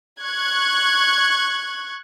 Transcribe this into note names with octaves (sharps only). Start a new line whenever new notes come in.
C#6 F#6 G#6